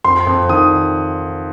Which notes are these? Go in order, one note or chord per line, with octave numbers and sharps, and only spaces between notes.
F2 C6
F2
D#3 D#6